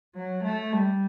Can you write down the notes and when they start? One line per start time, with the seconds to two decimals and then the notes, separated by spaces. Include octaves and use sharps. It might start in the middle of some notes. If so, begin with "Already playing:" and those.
0.15 F#3
0.44 A3
0.72 G3